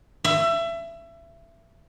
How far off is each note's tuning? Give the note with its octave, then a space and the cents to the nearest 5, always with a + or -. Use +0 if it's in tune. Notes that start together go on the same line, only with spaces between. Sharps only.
E5 +25